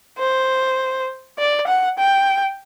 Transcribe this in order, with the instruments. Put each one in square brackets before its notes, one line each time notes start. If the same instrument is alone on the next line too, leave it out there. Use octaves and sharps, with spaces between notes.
[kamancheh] C5
D5
F#5
G5